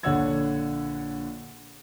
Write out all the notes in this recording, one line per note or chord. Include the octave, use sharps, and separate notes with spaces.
A#1 D3 C#5 F#5 E6 G#6